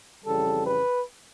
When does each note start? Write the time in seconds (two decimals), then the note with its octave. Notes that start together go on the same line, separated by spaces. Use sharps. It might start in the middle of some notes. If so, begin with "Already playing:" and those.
0.25 F2 C#3 E3 G3 A4
0.65 B4